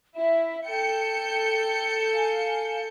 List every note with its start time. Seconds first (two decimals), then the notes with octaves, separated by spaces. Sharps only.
0.16 E4 E5
0.66 A4 G5 G6 C#7
2.14 F5 G#5